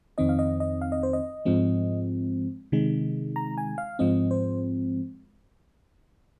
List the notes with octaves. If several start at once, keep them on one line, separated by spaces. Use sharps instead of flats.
F2 D#3 C4 D#5
F5
D#5
D#5
F5
D#5
C5
D#5
G#2 F3 G#3 C4
C3 D#3 G#3
A#5
G#5
F5
G#2 F3 G#3 C4 D#5
C5